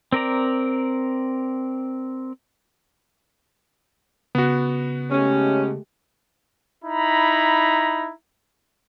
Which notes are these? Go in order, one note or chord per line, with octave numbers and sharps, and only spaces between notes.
C4 A#4 D5 A#5
C#3 B3 F#4
G#3 A3 C#4 G4
D#4 E4 A#5 B5